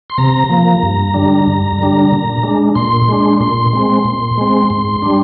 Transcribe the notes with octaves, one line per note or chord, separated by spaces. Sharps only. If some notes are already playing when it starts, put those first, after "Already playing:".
C6
C3 A#5
F3 A#3
G2
D3 G3 D4
G2
D3 G3 D4
A#2
G#3 D4
A#2 C6
G#3 D4
A#2 C6
G#3 C4
A#2
G#3 C4
G#2
G3 D4